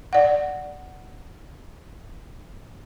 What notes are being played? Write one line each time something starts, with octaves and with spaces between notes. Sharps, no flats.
D5 F#5